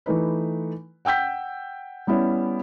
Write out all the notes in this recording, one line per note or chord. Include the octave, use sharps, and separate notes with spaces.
E3 A3 D#4 B4
F#5 G5 E6 G6 B6
G3 B3 C#4 E4